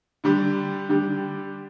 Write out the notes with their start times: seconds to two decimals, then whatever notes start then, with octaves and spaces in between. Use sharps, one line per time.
0.24 D3 G3 D4 G4
0.89 D3 G3 D4 G4